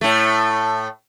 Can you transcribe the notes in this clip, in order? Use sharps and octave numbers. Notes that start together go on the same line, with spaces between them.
A2 A3